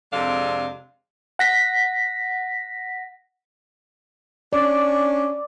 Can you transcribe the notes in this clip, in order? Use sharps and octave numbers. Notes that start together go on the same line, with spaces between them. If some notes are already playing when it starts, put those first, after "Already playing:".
F2 C3 G#3 D4 A4 F5
F#5 A#6 B6
C#4 D4 D5